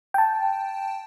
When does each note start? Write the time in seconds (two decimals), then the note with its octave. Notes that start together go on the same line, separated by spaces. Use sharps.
0.14 G5 A5